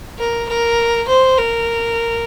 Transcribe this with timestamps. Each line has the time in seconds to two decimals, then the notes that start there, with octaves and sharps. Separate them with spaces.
0.19 A#4
0.49 A#4
1.08 C5
1.38 A#4